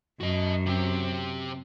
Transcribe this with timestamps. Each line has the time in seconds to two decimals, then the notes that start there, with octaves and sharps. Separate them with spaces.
0.21 F#2 F#4 D#5
0.66 C3 C4